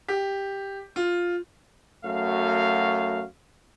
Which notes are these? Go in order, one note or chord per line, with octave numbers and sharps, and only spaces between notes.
G4
F4
F#2 A3 F#4 F5